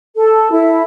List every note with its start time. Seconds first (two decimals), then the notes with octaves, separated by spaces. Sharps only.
0.16 A4
0.50 E4